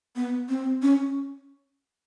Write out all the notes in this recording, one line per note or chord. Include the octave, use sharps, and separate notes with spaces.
B3
C4
C#4